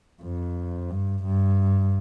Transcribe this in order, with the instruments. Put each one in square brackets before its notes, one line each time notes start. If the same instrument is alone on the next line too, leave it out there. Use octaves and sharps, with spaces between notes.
[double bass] F2
G2
G2